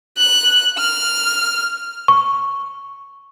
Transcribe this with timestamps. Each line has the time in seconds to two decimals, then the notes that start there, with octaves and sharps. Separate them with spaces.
0.18 F#6
0.78 F6
2.08 C#6